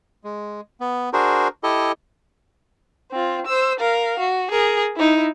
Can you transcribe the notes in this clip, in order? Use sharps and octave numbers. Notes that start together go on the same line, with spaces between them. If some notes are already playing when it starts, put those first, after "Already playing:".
G#3
B3
D4 F#4 G#4 A#4 C5
E4 G4 A4 D#5
C4 F4
C5 E6
A#4 F5
F#4
G#4 A#4
D#4 E4